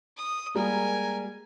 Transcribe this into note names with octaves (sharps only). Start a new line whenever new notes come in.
D#6
G3 G#3 A#3 A#4 G#5